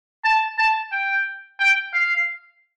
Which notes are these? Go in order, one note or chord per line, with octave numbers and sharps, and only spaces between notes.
A5
A5
G5
G5
F5